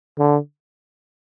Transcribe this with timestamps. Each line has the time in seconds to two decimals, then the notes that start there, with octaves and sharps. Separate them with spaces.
0.19 D3